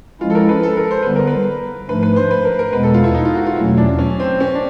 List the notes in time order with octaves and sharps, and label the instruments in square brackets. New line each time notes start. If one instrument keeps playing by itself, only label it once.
[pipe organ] F3 G#3 C#4 E4 [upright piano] F4
[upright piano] A4
A#4
B4
A4
A#4
C5
[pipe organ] D3 G3 B3 [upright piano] B4
[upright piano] A#4
B4
[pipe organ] G#2 F3 A3 D4 [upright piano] B4
[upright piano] B4
C5
B4
A#4
A#4
[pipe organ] E2 B2 G#3 B3 [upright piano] B4
[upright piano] A4
F4
E4
D#4
F4
F#4
F4
[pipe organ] E2 B2 F#3 A3 C#4 [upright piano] E4
[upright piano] D4
C#4
C4
C#4
D4